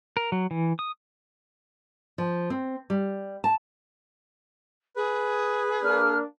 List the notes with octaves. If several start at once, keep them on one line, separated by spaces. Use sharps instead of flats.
A#4
F#3
E3
D#6
F3
C4
G3
A5
G#4 B4
A#3 D4 F6